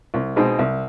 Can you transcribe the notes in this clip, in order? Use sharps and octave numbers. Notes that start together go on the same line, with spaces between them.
C2
B2 G#3 C4 D#4
C2